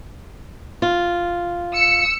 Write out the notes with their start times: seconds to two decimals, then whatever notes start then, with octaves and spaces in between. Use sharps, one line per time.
0.82 F4
1.74 E6 C#7